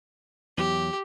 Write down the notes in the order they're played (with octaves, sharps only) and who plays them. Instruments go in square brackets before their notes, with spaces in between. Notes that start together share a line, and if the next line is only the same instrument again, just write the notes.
[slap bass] E2 F#3 [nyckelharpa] G4